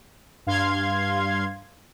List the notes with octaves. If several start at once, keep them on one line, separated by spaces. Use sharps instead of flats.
G2 F5 C6 G#6